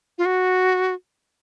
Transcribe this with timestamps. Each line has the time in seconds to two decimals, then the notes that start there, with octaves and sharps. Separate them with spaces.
0.18 F4
0.25 F#4